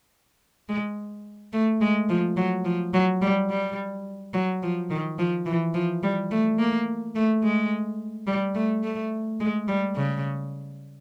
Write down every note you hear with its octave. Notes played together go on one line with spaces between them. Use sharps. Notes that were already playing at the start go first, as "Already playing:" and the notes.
G#3
A3
G#3
F3
F#3
F3
F#3
G3
G3
F#3
F3
D#3
F3
E3
F3
G3
A3
A#3
A3
G#3
G3
A3
A3
G#3
G3
C#3